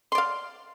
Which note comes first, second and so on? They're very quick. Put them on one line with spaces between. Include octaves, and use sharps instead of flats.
C6 D5 F5